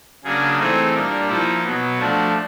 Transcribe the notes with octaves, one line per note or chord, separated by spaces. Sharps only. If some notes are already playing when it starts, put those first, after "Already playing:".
C#3 F#3 A#3 D4 G#4
E3 A3 C4 D#4 G#4
A#2 G3 A#3 D4 A#4
F3 A#3 D#4 E4
B2 F#3 B3
F3 A3 D4 F#4